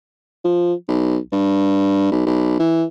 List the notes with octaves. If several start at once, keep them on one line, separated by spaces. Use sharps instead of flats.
F3
B1
G2
B1
B1
E3